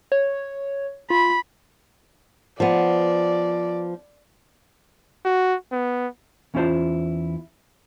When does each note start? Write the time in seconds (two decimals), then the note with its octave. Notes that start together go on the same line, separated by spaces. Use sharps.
0.12 C#5
1.10 F4 B5
2.60 F3 B3 D5
5.25 F#4
5.72 B3
6.54 E2 C#4 E4 F4 C5 A5